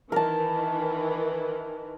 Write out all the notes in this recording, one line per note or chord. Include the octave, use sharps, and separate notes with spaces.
D#3 E3 A#4 A5